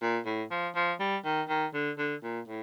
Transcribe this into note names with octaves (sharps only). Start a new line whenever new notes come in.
A#2
A2
F3
F3
G3
D#3
D#3
D3
D3
A#2
A2